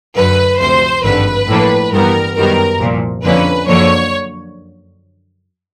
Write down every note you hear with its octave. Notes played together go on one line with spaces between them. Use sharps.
F#2 D3 F#3 B4
D2 C3 F3 C5
G#1 G2 D3 F3 B4
A2 F3 A#3 D4
G2 E3 G3 B3 A#4
F#2 D#3 G3 B3 A#4
C2 A#2 F3
F2 D3 F3 A#3 C#4 B4
F#2 D3 F3 A#3 C#5